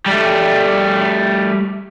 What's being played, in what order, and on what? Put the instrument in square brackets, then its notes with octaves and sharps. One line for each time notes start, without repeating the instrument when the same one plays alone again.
[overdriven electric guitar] G3 A3